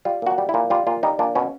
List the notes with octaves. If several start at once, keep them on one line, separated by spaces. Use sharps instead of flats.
G3 F4
A#2 F#4
G3
E4
A#2
G3 F4
A#2 F4
G3 D#4
A#2 D4
B2 C#4